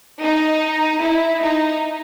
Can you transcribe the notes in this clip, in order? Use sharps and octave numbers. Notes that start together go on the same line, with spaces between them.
D#4
E4
D#4